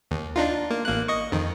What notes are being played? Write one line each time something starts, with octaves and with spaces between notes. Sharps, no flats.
D#2
D4 D#4 F4
A#3
A1 A#3 F#6
D#5 C#6
F2 D#3